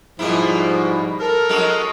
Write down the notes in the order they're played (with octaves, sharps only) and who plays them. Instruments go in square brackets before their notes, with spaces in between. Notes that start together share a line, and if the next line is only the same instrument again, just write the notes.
[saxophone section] G#2 F3 G3 [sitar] B2 A#3 E4
[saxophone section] A4 A#4
[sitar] G#3 C#4 F#4